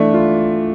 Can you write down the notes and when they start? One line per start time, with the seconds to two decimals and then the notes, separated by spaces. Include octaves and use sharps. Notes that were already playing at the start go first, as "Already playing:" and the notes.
Already playing: E3 A3 D4
0.14 F4